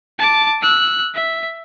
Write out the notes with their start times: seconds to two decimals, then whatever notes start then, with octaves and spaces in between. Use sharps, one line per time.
0.19 A5 D6
0.62 E6 F#6
1.15 E5